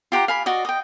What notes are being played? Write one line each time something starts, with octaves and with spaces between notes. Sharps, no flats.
F4 G4 F#5 A#5
F5 G#5 B5
F#4 D5 D#5
D#5 G5